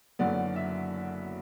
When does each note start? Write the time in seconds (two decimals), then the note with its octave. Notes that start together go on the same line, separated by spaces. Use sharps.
0.19 F#1 F#2 D3 F#3 B3 D5
0.56 E5